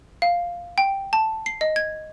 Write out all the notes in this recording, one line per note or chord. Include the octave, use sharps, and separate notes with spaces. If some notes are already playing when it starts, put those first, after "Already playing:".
F5
G5
A5
C7
D#5
G#6